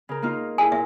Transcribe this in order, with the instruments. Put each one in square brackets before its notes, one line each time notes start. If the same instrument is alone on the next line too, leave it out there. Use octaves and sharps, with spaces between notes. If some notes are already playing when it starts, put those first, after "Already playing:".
[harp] C#3 A#4
A#3 D#4 F4
[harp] E4 G#4 [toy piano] G#5
[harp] A#2 [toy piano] E5